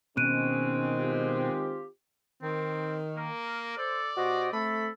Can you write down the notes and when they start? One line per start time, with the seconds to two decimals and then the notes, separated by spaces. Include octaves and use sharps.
0.17 B2 D#3 G#3 C4 C#4 F#6 D7 D#7
0.99 F4 G4
2.43 D#3 C4
3.17 A#3 A#4
3.78 A4 C5 D5
4.17 B2 F#4 G4 C5 D#5
4.53 A3 C4 A4 A5 B5